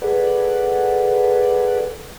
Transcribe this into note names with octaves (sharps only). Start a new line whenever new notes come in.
G#4 A4 B4 D5 F#5